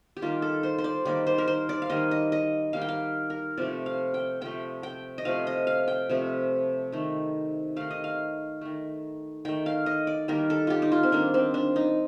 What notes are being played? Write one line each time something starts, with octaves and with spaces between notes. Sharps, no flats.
G4
D#3 G3 A#3 F4
A4
C5
C5
D5
D#3 G3 A#3 D5
C5
A#4
C5
D5
F5
D#3 G3 A#3 D#5
D#5
D#5
D#3 G3 A#3 F5
G5
F5
A#4
C3 F3 A3 D5
F5
G5
C3 F3 A3 G5
G5
D#5
C3 F3 A3 F5
D#5
F5
G5
C3 F3 A3
D#3 A3
D#3 A3 F5
D#5
F5
D#3 A3
D#3 A3 G5
F5
D#5
D5
D#3 G3 A#3 A#4
A4
F4 G4
D#4
F4
C4
D#3 G3 A#3 D4
C4
D4
D#4